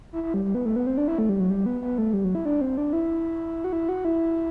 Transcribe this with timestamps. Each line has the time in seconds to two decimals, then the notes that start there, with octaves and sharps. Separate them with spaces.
0.13 E4
0.23 E4
0.34 G3
0.45 G3
0.55 B3
0.65 A3
0.76 B3
0.87 C4
0.97 D4
1.08 E4
1.18 A3
1.29 G3
1.40 F#3
1.50 G3
1.66 B3
1.82 B3
1.98 A3
2.14 G3
2.24 F#3
2.35 E4
2.45 D4
2.61 C4
2.78 D4
2.93 E4
3.64 F#4
3.73 E4
3.89 F#4
4.05 E4